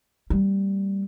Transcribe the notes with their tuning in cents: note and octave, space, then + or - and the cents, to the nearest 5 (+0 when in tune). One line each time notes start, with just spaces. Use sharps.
G3 +0 A#3 -45